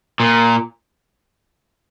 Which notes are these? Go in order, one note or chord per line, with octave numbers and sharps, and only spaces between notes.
A#2